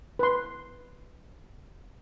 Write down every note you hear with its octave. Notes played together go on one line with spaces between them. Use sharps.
B4 C6